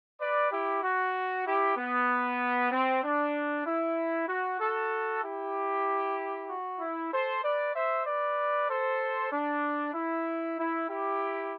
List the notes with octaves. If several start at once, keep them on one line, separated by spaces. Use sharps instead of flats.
B4 D5
E4 G4
F#4
E4 G4
B3
C4
D4
E4
F#4
F#4 A4
E4 G4
F#4
E4
A4 C5
B4 D5
C5 E5
B4 D5
A4 C5
D4
E4
E4
E4 G4